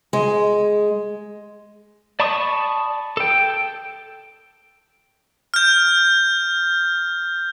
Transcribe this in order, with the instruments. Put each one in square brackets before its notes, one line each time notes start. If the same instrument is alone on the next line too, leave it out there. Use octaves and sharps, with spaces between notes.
[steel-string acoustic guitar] G#3
[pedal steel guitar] D5 A5 B5 C#6 D#6
A4 G5
[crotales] F6 G6